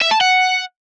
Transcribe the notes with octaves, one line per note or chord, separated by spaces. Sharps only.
E5
A5
F#5